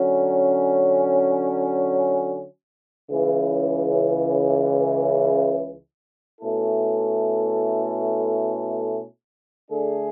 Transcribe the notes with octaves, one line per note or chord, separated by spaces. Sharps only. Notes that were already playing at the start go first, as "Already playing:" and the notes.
Already playing: D3 F#3 C#4
C#2 C#3 E3
B2 A3 C#4 E4 A4
D3 A3 D4 G#4